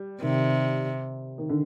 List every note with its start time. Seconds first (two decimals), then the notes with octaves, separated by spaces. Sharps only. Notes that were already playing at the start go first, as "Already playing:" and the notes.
Already playing: G3
0.21 C3 D#3
1.38 D#3
1.50 D3